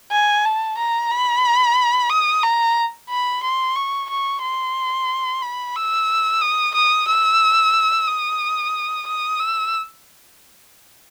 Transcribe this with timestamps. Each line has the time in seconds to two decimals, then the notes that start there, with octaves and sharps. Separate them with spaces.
0.11 G#5
0.45 A5
0.77 A#5
1.11 B5
2.10 D#6
2.43 A#5
3.09 B5
3.43 C6
3.76 C#6
4.10 C#6
4.42 C6
5.42 B5
5.75 E6
6.41 D#6
6.74 D#6
7.08 E6
8.07 D#6
9.07 D#6
9.40 E6